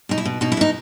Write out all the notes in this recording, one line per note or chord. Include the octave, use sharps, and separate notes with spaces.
B2 D#4
E4
B2
B2 D#4
E4
B2 D#4